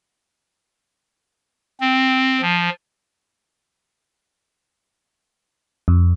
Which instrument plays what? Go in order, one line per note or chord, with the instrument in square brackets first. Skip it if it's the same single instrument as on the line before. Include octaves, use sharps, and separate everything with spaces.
[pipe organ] C4
F3
[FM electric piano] F2